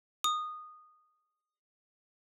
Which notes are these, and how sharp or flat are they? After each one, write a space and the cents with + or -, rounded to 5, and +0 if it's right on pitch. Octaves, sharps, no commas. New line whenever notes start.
D#6 -15